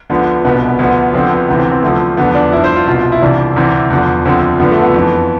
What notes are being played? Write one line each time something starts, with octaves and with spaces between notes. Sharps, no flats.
D2 D3 F3 B3
C2 B2 B3
B3
B3
D2 D3 F3 B3
D2 D3 F3 C4
B3
D2 C3 E3 B3
C4
C4
D2 D3 F3 A3
E2 D3 F3 B3
D4
G2 F3 E4
C5
F4
C2 B2 F4
E4
C2 C3 E3 D4
D2 C3 E3
E2 D3 F3
D2 D3 F3 C4
G2 D3 F3 B3
A3
B3
F2 E3